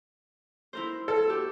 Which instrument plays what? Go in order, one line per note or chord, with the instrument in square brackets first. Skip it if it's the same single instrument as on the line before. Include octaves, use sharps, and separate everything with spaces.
[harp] E4 A#4 C5
[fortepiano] A4
[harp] F#4 G4